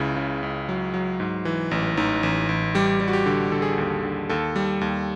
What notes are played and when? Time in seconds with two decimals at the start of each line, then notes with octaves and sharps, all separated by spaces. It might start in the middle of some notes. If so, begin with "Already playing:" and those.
Already playing: C#2 C#3 E4
0.16 C#3
0.43 C#2
0.69 F#3
0.94 F#3
1.20 G#2
1.45 E3
1.71 A1
1.97 A1 D#4
2.23 A1
2.49 A1
2.75 G3 G4
3.00 G3
3.08 F#4
3.13 G4
3.26 D3
3.52 D3 A4
3.62 G#4
3.71 G4
3.78 D#2 G#4
4.03 D3
4.29 D#2 A4
4.56 G3
4.81 D#2